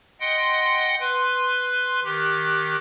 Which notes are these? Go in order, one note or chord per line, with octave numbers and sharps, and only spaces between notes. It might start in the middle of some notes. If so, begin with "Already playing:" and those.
D#5 F#5 G5 C6
B4 C6
D#3 G4 F#6